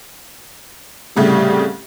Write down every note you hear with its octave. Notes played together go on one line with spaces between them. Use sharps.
C2 A2 C#3 G3